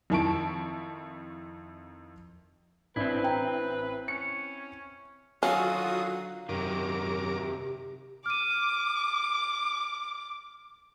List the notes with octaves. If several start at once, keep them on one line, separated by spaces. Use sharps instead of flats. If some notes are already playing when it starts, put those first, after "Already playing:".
F2 D#3 E4 A5 C#6 D7
A1 C4 D4 E4 B4
G5 A#5
C#4 C#7
D3 D#3 F#3 C#4 F4 F#4 F5 D#6
F#2 C3 D#3 G4 A#4 D6
D6 F6 D#7